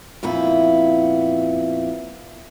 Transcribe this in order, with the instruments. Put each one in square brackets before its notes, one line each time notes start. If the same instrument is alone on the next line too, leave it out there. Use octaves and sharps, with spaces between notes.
[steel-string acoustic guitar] F2 A#2 B3 E4